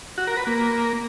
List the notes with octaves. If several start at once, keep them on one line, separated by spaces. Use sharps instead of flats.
F#4
A#4
B4
A#3